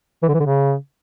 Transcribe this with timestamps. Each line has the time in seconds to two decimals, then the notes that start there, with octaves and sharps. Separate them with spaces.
0.23 E3
0.28 D3
0.34 E3
0.40 D3
0.46 C#3